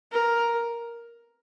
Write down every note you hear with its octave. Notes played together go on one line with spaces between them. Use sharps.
A#4